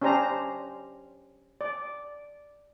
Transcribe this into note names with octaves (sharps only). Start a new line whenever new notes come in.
C#4 D4 G4 C5 A#5
D5